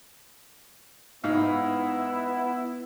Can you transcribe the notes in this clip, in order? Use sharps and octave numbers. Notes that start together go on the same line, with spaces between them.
G#2 B3 E4 F5